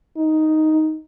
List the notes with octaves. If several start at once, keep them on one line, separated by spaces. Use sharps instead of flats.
D#4